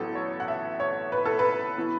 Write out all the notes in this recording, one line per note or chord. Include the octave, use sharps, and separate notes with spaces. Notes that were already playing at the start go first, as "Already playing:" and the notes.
Already playing: A1 A2 F#3 B3 A4
C#5
F#5
E5
C#5
B4
A4
B4
E3 B3